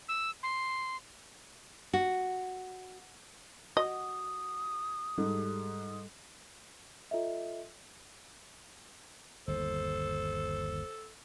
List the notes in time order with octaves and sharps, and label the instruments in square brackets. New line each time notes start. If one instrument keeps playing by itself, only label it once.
[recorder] E6
C6
[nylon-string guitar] F#4
[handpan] F#4 [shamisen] D#5 [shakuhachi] D#6
[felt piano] G#2 [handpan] G3 A4
[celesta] F4 A4 D#5 E5
[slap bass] G1 D#2 [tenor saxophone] A4 [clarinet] C5